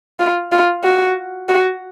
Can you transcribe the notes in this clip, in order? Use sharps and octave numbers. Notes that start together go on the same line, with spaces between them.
F4
F4
F#4
F#4